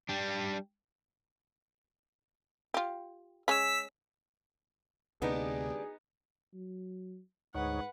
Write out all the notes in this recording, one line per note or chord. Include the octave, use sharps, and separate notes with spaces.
G3 D4
F4 G4
G#3 C#4 E6 B6
D2 C3 B3 D4 D#4 G4 G#4 B4
F#3
D2 G#2 D#4 B4 C#5 F#5